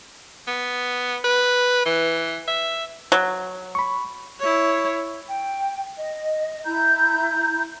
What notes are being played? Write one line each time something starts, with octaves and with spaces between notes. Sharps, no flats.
B3
B4
E3
E5
F#3
B5 C#6
E4 C#5
G5
D#5
E4 A#5 G6